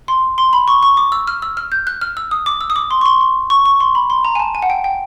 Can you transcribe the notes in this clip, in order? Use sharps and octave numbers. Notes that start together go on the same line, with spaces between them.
C6
C6
B5
C#6
C#6
D6
E6
F6
E6
F6
G6
F#6
F6
E6
D#6
D6
E6
D#6
D6
C6
C#6
C6
C6
C#6
C#6
C6
B5
C6
A#5
G#5
A5
G#5
F#5
G5
G5